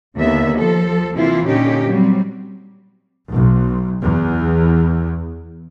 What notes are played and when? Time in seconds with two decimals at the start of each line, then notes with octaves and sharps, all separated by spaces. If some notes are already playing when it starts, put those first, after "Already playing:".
0.17 D#2 D3 B3 E5
0.55 F3 A4
1.15 C3 E3 A#3 E4 F4
1.46 A#2 D3 C#4 D#4 G4
1.87 F#3 G3 C4
3.31 B1
4.04 E2